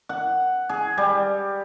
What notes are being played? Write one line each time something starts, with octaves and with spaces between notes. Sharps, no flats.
F#5
G#4
G3